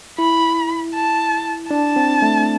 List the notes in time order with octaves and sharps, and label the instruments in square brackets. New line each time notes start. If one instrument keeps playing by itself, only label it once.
[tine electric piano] E4 [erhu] B5
[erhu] A5
[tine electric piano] D4 [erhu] A5
[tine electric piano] C4
A3